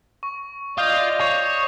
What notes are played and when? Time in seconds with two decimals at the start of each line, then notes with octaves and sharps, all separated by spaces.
0.23 C#6
0.78 F4 D5 D#5 D#6 G6 F7
1.20 C#5 C#6 C7 F7